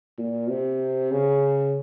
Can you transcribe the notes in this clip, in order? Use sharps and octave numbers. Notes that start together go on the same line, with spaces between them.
A#2
C3
C#3